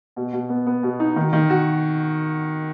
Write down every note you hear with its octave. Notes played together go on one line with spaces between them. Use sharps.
B2
B2
B3
B3
B2
D#4
D#3
D#3
F#4